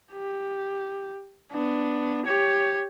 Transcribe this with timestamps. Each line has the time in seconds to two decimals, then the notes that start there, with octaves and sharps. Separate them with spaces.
0.12 G4
1.52 B3 D4
2.26 G4 C#5